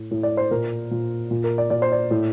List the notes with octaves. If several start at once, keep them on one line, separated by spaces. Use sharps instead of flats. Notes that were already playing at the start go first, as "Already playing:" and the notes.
Already playing: A2
A2
D5
C5
A#2 A#4
A#2
A#2
A#4
D5
A#2 D5
C5
D5
A2